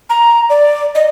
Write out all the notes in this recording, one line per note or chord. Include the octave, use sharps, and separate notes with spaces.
A#5
D5
D#5